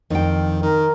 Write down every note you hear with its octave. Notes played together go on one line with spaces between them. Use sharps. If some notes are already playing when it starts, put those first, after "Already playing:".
F2 D#3 G5
D#3 A#4